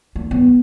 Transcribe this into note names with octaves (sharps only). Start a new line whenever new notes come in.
A#3
B3